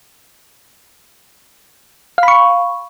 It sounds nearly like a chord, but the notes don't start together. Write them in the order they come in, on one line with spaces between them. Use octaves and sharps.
F5 B5 C#6